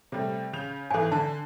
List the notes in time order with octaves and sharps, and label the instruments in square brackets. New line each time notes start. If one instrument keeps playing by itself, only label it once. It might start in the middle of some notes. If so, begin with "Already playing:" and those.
[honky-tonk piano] C3 G3 A3
C#3 G6 F7
[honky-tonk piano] G#1 E3 [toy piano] A4 G#5
[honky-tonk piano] D3 [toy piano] A5